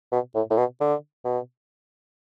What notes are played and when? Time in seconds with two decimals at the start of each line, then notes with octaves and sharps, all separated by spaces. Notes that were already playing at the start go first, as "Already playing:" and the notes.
0.12 B2
0.35 A2
0.50 A2
0.58 B2
0.81 D3
1.25 B2